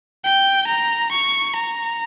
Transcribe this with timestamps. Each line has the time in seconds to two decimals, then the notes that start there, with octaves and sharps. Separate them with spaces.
0.25 G5
0.68 A#5
1.12 C#6
1.56 A#5